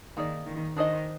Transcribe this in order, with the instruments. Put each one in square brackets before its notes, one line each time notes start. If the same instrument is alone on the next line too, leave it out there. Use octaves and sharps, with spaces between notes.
[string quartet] D#3 [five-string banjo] A#3 D#4 G#4 D5
[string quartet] D#3
[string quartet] D#3 [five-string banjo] D4 G#4 C5 D#5